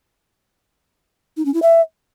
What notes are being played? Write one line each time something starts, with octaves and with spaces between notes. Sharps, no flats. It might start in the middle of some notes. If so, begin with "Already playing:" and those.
D#4
C#4
E4
E5